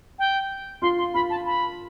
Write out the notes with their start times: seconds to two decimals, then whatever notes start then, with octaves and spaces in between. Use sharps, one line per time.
0.19 G5
0.82 F4 C6
0.98 C6
1.14 F4 B5
1.30 A5
1.46 B5